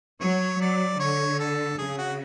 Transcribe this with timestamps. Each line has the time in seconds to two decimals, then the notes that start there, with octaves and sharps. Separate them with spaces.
0.20 F#3 C#5
0.60 F#3 D5
0.99 D3 C#5
1.39 A4
1.78 C#3 G#4
1.98 F#4